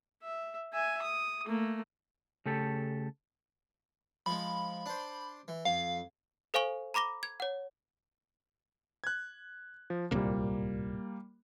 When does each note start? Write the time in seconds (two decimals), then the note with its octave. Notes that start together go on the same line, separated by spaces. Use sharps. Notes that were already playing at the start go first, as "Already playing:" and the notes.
0.23 E5
0.73 E5 G#5
1.02 D#6
1.47 A3 A#3
2.46 C#3 A3 G4 A4
4.26 F3 G#3 B5
4.86 D4 C5
5.48 E3
5.65 F2 F5
6.54 A4 C5 F5 G#5 C#6 G7
6.94 A#5 B5 D6 A#6 G7
7.23 G#6
7.40 C#5 F#5
9.04 F#6 G#6
9.90 F3
10.11 D1 C2 A#2 G3 A#3